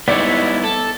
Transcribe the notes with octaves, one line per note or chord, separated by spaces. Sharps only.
G#2 G3 B3 D#4 E4 C#5 D5
A4